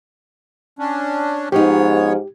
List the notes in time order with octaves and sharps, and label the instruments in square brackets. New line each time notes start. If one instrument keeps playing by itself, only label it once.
[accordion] C#4 D4
[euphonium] G#2 [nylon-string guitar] F3 D#4 [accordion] B3 C#5 [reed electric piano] G4